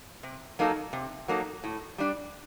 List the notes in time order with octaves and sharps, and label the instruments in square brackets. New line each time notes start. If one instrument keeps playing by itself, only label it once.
[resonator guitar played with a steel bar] C3
F#3 A#3 D#4 A4
C3
F#3 A#3 D#4 A4
A2
G3 D4